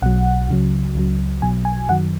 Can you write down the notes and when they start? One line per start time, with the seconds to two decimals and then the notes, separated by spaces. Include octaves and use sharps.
0.02 B1 B2 F#3 F#5
0.49 C#2 C#3 F#3
0.95 C#2 C#3 F#3
1.42 B1 B2 F#3 G#5
1.65 G#5
1.89 F#2 D#3 F#3 F#5